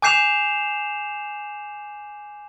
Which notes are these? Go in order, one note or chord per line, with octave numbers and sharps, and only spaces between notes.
G#5 D6 G6 C7 E7 F7